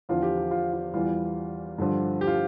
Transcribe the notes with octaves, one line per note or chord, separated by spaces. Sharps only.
E2 D3 F3 F4
G4
F4
F4
F4
E2 E3 G3 F4
G2 D3 F3
G4
F4